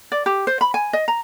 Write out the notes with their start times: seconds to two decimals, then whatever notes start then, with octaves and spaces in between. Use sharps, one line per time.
0.12 D5
0.26 G4
0.47 C5
0.61 B5
0.74 G#5
0.93 D#5
1.08 A#5